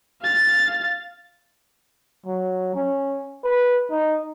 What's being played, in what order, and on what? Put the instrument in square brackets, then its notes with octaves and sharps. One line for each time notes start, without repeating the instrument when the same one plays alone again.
[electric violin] F5 A6
[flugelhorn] F#3
C#4
B4
D#4